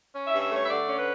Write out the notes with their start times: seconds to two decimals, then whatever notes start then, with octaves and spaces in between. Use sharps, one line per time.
0.13 C#4
0.27 E5
0.33 G2
0.41 E5
0.50 A3
0.55 C#5
0.65 E5
0.69 D3 D5
0.88 C#4
0.97 B4